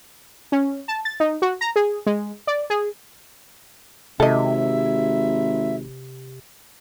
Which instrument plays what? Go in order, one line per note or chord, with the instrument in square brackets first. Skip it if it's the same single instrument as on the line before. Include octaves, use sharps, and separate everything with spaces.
[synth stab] C#4
A5
A6
D#4
F#4
A#5
G#4
G#3
D5
G#4
[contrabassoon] G#1 [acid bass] C3 [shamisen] A4 D#5 [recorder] E5